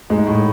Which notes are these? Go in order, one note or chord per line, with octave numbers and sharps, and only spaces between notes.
G#2 G#3
A2